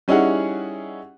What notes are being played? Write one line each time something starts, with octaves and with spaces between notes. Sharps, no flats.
G3 C#4 D#4 E4 G#4 F#5